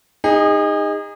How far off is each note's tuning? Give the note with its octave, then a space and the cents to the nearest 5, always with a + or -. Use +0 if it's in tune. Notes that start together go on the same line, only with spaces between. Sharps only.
D#4 +0 G#4 -35